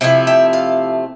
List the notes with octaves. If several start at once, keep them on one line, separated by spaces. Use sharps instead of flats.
C3 F3 A3 E4 F5
E5 G5
F5 A5